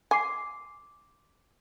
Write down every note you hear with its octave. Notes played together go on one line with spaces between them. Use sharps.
G#5 C6 D6 C7